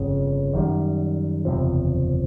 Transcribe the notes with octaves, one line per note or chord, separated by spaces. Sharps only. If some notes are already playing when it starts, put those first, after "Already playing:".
Already playing: G1 F2 C#3
F#2 D#3 G3
F#1 E2 C3 F3